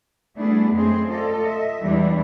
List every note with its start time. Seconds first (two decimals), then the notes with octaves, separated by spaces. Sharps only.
0.38 G3 A3 B3 D4 E4 G#4
0.73 F#2 G#3 A3 C4 G#4 C5
1.07 F4 A4 D5 D#5
1.42 D#5 E5
1.82 E2 E3 G3 G#3 D4 E4